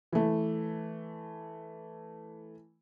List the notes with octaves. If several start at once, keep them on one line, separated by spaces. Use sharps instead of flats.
E3 A3